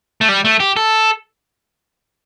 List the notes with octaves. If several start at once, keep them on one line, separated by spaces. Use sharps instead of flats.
A3
G3
A3
G4
A4